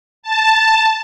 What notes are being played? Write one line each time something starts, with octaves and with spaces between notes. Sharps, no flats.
A5